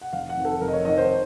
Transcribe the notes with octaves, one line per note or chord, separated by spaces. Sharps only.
F#5
F1 F5
F#5
F2 D#3
A4
F1 A#4
D#5
C#5
F2 D#3 D#5
C5